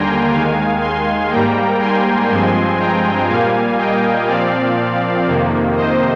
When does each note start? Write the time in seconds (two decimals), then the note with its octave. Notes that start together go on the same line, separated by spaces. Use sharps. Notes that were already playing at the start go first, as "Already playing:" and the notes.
Already playing: D#2 D3 G3 A#3 G5 G#5 A#5 C6
0.32 D#2 D#3 G#3 F5 G#5
0.81 G#5 C6
1.31 G#2 G3 A#3 G5 A#5
1.80 G#5 C6
2.29 G2 F3 G#3 C4 G#5 C6
2.79 G5 A#5
3.28 A#2 G3 A#3 F5 G#5
3.78 D#5 G5
4.27 A#2 F3 C4 D5 F5
5.27 F2 C3 D#3 A#3
5.76 C5 D#5